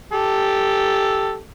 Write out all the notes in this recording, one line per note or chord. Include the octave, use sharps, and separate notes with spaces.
G4 A4